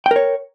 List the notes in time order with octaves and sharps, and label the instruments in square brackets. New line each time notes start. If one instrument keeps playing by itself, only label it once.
[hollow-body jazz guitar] G5
A#4
C#5